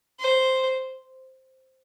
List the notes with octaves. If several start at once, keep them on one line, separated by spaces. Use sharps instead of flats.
C5